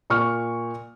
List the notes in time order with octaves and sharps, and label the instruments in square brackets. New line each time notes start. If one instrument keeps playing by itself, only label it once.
[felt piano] A#2 C#6 F6